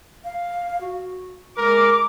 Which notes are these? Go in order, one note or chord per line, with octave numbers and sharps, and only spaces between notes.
F5
F#4
G#3 A#4 D6